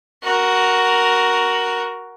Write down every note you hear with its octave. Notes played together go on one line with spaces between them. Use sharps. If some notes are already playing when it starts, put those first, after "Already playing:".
F#4 A#4